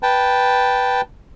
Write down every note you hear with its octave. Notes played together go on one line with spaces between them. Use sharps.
B4 G5 A5